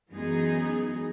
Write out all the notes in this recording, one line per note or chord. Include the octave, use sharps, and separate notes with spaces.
F#2 E3 G#3 B3 D#4 G#4